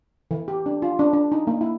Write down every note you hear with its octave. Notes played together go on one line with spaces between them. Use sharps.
E3
G4
D4
F4
D4
D4
D#4
A#3
E4